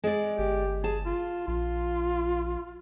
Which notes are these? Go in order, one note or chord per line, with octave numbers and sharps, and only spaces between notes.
G#3 D5
G1 G4
G#4 A5
F4
A#1 F4